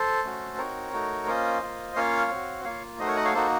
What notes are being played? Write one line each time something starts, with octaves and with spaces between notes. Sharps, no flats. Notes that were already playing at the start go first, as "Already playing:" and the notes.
Already playing: A4 C5
A3 C#4 F#4
C4 D#4 F#4 A#4 C#5
A3 D#4 F#4
A#3 C#4 F4 C5 D#5
A#3 F4
A#3 C#4 F4 C#5 F5
C4 F#4
A#3 F4 C#5 F5
A3 D#4 F#4 C5 D#5
A#4 C#5
D#5 F#5
C#5 F5
A#3 D#4 F#4 A4 C5